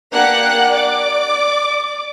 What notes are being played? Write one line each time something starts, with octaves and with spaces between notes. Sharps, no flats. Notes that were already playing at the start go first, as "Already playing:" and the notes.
A#3 D4 G4 F#5 F#6
D5 D6